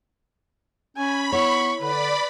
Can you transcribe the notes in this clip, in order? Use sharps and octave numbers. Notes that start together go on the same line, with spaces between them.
C#4 G#5 B5
B3 E4 C#5 C#6
D3 B4 D5 B5